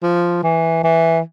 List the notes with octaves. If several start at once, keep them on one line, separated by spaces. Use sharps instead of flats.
F3
E3
E3